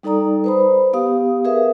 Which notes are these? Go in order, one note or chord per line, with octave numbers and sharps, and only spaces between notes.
G3 D#4 A4 D5 A#5 D#6
B4 C5 B5
B3 G4 F5 D#6
G#4 A#4 B4 E5 F5